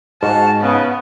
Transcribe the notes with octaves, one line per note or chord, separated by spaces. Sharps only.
G#2 F#4 F5 A5
C#3 B3